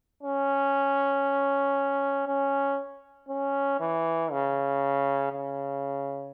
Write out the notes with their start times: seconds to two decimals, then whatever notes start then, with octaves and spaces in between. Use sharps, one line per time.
0.23 C#4
2.27 C#4
3.29 C#4
3.80 E3
4.31 C#3
5.32 C#3